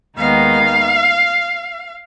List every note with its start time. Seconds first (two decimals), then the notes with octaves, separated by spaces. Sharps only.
0.17 D#2 D#3 G#3 B3 D#4 F5